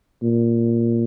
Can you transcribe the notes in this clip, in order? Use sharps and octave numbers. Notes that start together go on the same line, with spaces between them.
A#2